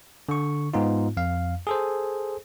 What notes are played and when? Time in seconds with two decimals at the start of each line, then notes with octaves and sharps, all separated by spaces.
0.29 D3 C#6
0.74 G#2 B3 D#4 F4
1.17 F2 F5
1.67 G#4 A4 C5